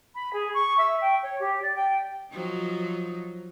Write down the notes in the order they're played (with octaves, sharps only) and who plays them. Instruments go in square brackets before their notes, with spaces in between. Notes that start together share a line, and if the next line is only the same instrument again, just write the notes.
[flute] B5
G#4
C#6
E5
G5
C#5
G4
D5
G5
[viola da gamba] F3 F#3 D#4